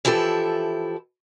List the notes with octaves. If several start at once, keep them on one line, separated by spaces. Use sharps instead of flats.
E3 F3 E4 G4 A4